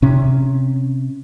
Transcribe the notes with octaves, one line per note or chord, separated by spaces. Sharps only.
C3 C#4